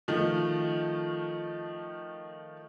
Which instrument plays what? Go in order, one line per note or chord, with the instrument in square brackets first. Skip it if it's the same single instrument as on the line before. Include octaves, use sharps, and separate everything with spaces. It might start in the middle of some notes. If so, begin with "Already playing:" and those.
[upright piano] D#3 F3 A3 D#4